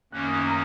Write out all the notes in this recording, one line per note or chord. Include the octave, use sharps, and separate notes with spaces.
F#2 D#3 A#3 C#4 F#6
D#6
C#6
A#5 D#6